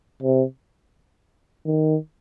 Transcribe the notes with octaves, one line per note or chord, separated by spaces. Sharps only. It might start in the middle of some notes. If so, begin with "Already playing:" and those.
C3
D#3